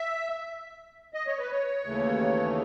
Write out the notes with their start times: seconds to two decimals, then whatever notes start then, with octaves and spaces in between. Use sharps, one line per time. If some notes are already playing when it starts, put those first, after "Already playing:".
Already playing: E5
1.14 D#5
1.27 C#5
1.39 B4
1.51 C#5
1.86 D#2 C#3 E3 A3